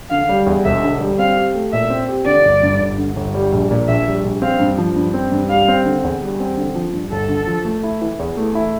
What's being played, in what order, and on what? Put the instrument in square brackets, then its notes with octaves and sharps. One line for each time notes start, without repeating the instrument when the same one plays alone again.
[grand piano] D3 [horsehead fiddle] F5
[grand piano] G3
E2
[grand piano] E1 [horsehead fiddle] E5
[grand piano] D3
G3
[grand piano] C4 [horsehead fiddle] F5
[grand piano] G4
A3
[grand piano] A#2 [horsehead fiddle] E5
[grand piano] C4
G4
[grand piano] D3 [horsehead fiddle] D5
[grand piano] G1
G2
G1
D3
G1
G3
A#1
A#2
[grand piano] A#1 [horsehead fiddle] E5
[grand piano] G3
A#1
[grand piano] C4 [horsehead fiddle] F5
[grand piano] G2
F3
G2
C4
G2
[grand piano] G3 [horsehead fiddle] F5
[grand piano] C4
D3
E2
G3
C4
D3
F3
G2
[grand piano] G1 [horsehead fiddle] A4
[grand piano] D3
F3
A3
E4
E3
E2
A3
E4